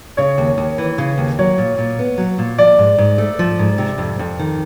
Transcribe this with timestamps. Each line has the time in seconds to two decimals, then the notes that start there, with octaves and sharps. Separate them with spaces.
0.17 C#3 C#5
0.38 D#2
0.58 D#2
0.78 E3
0.98 C#3
1.18 D#2
1.39 F#3 C#5
1.58 A#2
1.78 A#2
1.99 B3
2.18 F#3
2.38 A#2
2.58 F3 D5
2.79 G#2
2.98 G#2
3.18 A3
3.39 F3
3.59 G#2
3.78 C3
3.98 F2
4.19 F2
4.39 D#3